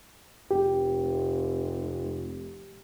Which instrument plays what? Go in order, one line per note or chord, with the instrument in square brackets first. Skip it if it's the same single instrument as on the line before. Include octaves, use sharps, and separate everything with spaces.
[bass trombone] F1 [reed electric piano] G4